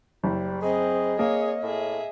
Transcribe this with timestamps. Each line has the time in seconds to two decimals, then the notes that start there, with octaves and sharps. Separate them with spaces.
0.24 F#1 G3
0.62 C4 G#4 D#5
1.19 A#3 G#4 C#5
1.63 A2 G#4 E5